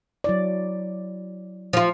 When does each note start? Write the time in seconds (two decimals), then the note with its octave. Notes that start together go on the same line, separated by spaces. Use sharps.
0.24 F#3 E4 D5
1.73 F3 F4